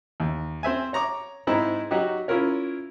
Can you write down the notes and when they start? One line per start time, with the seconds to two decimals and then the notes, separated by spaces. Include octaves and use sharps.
0.20 D#2
0.63 C4 C5 E5 G#5
0.93 C#5 A#5 C#6 D6
1.47 G#2 C4 D#4 E4
1.91 F#3 D#4 F#4 G4
2.28 C#4 E4 F4 A#4 C#5